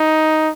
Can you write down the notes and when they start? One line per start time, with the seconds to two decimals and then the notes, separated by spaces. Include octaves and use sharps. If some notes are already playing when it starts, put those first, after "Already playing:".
Already playing: D#4